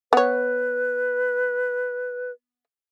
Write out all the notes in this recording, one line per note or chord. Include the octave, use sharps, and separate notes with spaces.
B3 B4 C#5